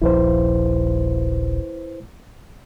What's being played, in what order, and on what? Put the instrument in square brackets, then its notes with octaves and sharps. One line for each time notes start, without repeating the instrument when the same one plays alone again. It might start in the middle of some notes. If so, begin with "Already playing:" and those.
[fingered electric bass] D#1 A#1 F3 [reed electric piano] E4 B4 C5